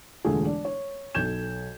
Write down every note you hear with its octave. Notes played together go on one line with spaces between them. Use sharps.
E1 D3 A3 F4 G#4
D4
C#5
B1 A4 G6 G#6 E7